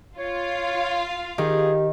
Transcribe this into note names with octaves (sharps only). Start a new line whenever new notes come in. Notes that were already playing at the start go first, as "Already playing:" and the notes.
F4 C#5 F5
D#3 G4 G#4